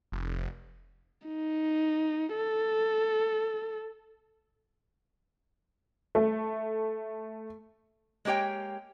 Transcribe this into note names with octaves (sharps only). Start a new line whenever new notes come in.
F1
D#4
A4
A3
G#3 A#3 G4 C#5 G5